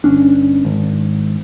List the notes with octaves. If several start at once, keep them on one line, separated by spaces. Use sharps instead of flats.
G1 C#4 D4
G#1